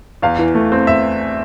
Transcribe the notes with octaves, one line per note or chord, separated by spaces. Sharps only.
E2 F5
E3
A3
C4
E5